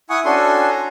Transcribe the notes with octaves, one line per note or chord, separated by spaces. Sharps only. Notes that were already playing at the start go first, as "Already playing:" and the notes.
E4 F#5 G#5 C#6 D#6
C#4 D4 F#4 A4 G#5 C6
A#5